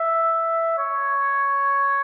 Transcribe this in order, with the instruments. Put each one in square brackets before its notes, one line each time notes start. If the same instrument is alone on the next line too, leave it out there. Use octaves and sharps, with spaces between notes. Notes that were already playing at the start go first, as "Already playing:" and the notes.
Already playing: [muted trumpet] E5
C#5